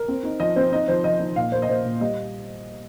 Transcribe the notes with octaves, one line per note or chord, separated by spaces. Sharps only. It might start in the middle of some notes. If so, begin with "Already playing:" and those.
Already playing: A#4
C4
D#4
F3 D#5
C4 C5
D#4 D#5
F3 C5
F3 D#5
D#4
A#2 F5
A#3 C5
D#5
A#2 C5
A#2
G3 D#5